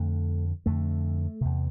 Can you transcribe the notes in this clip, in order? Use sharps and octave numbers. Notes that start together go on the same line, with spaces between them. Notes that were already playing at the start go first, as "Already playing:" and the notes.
Already playing: F2 D3 A3
F2 D3 A3
E2 C3